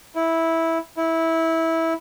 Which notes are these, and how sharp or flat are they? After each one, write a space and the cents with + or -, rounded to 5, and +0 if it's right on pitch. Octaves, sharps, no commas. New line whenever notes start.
E4 -10
E4 -15